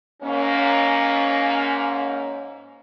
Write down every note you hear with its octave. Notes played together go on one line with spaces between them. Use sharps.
G#2 A#3 C#4